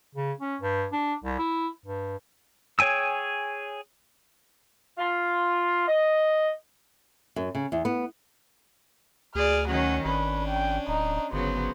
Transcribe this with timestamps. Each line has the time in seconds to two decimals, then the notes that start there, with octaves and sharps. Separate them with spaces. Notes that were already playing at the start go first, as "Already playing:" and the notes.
0.15 C#3
0.41 C#4
0.62 G2
0.93 D4
1.24 C2
1.39 E4
1.86 G2
2.79 G#4 C#5 G5 G#5 E6
4.99 F4
5.88 D#5
7.36 F#2
7.55 C#3
7.72 E2
7.85 B3
9.35 D2 G#4 D5 F6
9.68 D#3 F#3 C#4 F#5
10.05 G#1 C#4 D4 B4
10.48 G5
10.88 D1 D#4
11.32 G1 C#3 F#3 B3 C5